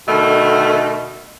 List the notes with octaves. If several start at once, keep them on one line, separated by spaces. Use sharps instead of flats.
B2 D3 D#3 A3